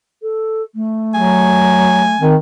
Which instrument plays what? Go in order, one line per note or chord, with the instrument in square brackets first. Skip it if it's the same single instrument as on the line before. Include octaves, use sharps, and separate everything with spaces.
[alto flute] A4
A3
[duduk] F#3 [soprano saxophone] G#5
[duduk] D#3 [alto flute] C4